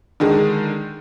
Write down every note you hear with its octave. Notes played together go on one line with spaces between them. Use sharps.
D3 D#3 G#3